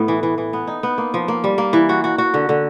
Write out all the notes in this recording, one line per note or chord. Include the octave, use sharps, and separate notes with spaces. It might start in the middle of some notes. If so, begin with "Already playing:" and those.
Already playing: A2 B3
E3
E3
E3
B3
D#4
B3
A#3
F3
A#3
G3
A#3
E3
F#4
F#4
F#4
D3
D3